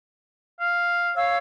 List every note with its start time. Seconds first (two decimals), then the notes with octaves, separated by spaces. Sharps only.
0.60 F5
1.15 C#5 F5 E6